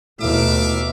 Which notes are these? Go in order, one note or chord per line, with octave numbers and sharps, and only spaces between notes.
D#2 B2 A3 E4 E5 F5 D6